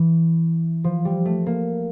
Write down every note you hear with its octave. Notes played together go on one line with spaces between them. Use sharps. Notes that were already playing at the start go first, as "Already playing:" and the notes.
Already playing: E3
F3
G3
A3
A#3